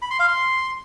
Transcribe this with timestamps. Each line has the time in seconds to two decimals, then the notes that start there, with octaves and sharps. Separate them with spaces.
0.02 B5
0.11 C6
0.19 F5
0.28 C6